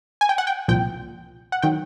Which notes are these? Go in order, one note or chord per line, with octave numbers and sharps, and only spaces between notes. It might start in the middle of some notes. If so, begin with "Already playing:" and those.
G#5
G5
F#5
G5
C2 A#2 F3 G5
F#5
D#3 F#3 G5